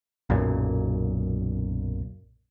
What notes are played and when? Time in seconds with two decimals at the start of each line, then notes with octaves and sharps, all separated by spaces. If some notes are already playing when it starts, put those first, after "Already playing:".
0.30 B1 F#2 A#2 C#3